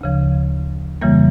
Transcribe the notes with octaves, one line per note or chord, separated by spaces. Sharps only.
D2 C#3 F3
F2 C#3 E3 G3 A#3